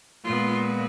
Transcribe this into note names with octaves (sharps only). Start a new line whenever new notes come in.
A#2 G#3 B3 F4